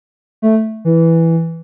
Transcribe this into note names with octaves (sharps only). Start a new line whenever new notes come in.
A3
E3